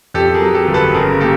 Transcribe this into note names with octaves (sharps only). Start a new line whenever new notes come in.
F2 G4 A4
G#4 A#4
F#3
G4 A4
G1
A4 B4
C#3 G#4 A#4
A#4
A#3 G4 A4